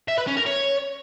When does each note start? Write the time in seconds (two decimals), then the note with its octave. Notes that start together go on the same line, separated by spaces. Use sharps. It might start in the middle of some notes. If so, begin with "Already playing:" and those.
0.08 E5
0.18 B4
0.27 C#4
0.37 A#4
0.46 C#5